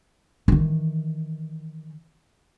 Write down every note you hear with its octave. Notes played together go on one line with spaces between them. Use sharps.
D#3 E3